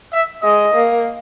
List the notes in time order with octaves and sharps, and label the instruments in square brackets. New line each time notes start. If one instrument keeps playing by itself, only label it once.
[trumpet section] E5
[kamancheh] G#3 [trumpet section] D#5
[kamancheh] A#3